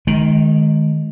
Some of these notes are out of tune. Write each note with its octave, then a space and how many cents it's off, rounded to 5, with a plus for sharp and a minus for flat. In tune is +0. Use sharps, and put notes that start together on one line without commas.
D#3 +0 G#3 +35